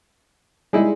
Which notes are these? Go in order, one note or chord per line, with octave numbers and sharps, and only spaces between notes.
G3 G#3 D#4 E4 G#4